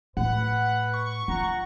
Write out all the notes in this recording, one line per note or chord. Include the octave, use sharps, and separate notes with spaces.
A2 B4 F#5
C#6
F4 F#5 A#5